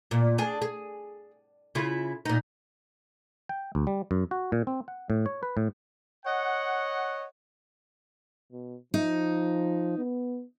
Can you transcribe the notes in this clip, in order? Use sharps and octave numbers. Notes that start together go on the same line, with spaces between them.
A#2
D4 G#4
G#4
C#3 E4 F4
A#2 D#4
G5
D2
G3
F#2
F#4
A#2
C4
F#5
A2
C#5
B4
A2
C#5 D#5 F#5
B2
F3 D#4
B3